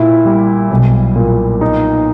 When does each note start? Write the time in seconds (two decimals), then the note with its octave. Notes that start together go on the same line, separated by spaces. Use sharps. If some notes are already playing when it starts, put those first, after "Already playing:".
Already playing: A#2 E4
0.25 G3
0.71 B1
1.16 A#2
1.61 D#4